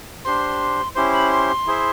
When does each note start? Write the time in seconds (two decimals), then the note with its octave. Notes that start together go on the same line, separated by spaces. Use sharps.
0.24 D4 G4 C5 C6
0.95 C#4 E4 G4 C5 C6
1.13 B5
1.30 C6
1.67 E4 G#4 C5 E5